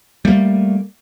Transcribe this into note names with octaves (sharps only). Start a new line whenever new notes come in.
G3 A3 A#3